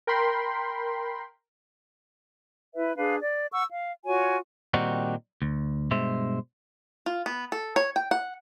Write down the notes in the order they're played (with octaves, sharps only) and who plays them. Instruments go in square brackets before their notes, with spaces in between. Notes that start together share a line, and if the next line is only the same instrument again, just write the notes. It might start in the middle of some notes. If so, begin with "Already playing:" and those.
[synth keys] A#4 G5 B5 C6
[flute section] E4 B4 E5
D4 G#4 B4 F5
D5
F#5 C#6 E6
F5
F4 F#4 C#5 G#5
[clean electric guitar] A#2 D#3 G3 C4 D#4 F#4
D2
G2 B2 G#3 C5 E5
[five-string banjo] F4
B3
A4
C#5
G5
F#5